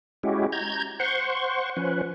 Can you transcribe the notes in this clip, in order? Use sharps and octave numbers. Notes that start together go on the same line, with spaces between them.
G#3 C#4 E4 F#4 G4
A#5 G6 G#6
C5 F#5 C6 C#6
F3 C#4 B4